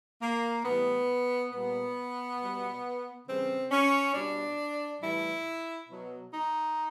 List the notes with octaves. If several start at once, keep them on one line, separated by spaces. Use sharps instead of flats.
A#3
A2 E3 G3 B3
A#2 G3 B3
B2 G3
C#3 E3 G3 C4
C#4
B2 G3 D4
A2 E3 G3 E4
B2 F#3
D#4